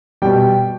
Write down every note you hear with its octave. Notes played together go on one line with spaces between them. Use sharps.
B2 G3 G5